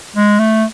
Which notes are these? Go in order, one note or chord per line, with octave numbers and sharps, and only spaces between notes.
G#3
A3